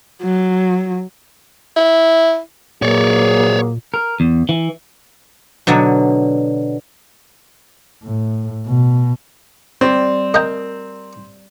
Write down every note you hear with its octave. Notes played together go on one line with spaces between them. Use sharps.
F#3
E4
A#2 F#3 A#3 G#4 C#5 D5
A#4
E2
E3
B2 D3 F#3
A2
B2
G3 C4
A#4 D#5 G5